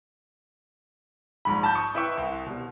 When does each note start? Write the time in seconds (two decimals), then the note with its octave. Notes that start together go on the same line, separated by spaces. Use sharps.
1.45 A#1 G#2 B5
1.63 A5 B5 G6
1.75 C#6 D#6
1.95 E4 B4 E5 G5 C#6
2.17 C2
2.46 B2 G3